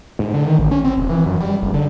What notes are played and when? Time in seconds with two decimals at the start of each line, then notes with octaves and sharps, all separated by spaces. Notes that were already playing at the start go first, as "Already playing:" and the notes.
0.19 G#2
0.34 D3
0.46 D#3
0.59 A1
0.71 C#4
0.84 C4
0.98 E1
1.10 E3
1.26 F#2
1.40 G3
1.63 F#1
1.74 D3